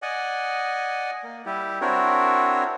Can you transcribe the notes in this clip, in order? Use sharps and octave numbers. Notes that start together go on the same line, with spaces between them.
D5 D#5 F#5 G#5
A#3
G3 E4 G4
C4 D4 E4 F#4 A#4 C#5